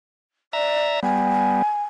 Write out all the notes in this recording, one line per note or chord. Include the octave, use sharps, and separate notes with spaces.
D5 E5 A#5
G3 B3 G#5